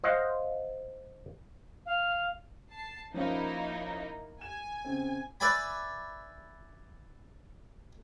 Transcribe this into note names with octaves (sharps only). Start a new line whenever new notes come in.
C5 D#5 F5 F#5
F5
A5 C7
F3 A#3 C#4 D#4 E4 F5
G#5 E7
C#3 C4
B4 D5 E5 G#5 B5